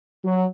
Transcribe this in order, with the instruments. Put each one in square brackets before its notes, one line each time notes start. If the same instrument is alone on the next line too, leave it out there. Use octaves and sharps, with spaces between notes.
[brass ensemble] F#3